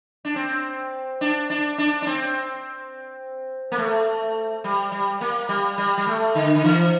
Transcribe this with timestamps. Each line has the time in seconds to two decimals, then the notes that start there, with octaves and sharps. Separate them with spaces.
0.25 D4
0.36 C4
1.21 D4
1.50 D4
1.78 D4
2.02 D4
2.07 C4
3.72 A#3
3.78 A3
4.64 G3
4.92 G3
5.21 A#3
5.49 G3
5.78 G3
5.98 G3
6.07 A3
6.35 D3
6.55 D3
6.64 E3